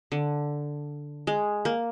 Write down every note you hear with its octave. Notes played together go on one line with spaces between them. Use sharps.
D3
G#3
A#3